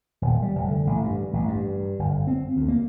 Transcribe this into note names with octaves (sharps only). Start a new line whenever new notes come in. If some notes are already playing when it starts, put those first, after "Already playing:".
D#1
G3
F1
D3
A1
G2
A1
G2
G1
C4
D2
A#3